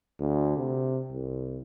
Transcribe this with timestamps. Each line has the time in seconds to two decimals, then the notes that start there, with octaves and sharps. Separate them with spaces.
0.20 D2
0.57 C3
1.10 C2